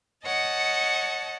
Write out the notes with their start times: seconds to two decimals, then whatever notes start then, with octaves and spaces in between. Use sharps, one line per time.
0.24 C#5 D#5 F#5 A5